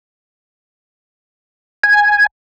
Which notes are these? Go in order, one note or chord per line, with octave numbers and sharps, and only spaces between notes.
G#5